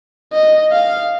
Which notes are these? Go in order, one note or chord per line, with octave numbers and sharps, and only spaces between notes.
D#5
F5